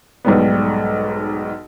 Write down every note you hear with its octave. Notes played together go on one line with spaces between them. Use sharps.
B1 G#2 G3 B3